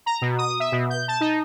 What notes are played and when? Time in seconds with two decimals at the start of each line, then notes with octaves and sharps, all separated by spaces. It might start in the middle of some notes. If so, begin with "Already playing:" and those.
0.06 A#5
0.21 B2
0.38 D#6
0.60 E5
0.72 B2
0.90 G6
1.08 A5
1.21 D#4